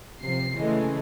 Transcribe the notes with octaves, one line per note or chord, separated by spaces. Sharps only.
C3 F3 C7
C#3 E3 G#3 A3